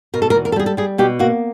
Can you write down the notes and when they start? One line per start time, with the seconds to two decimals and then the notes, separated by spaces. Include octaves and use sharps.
0.14 B2 A#4
0.22 A4
0.30 A#4
0.35 E2
0.45 A#4
0.52 A4
0.56 G3 G#4
0.66 A4
0.77 G3 G#4
0.98 B2 G4
1.19 A#3 F#4